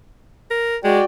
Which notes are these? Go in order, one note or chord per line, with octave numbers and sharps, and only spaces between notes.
A#4
G#3 F#4 D5 G5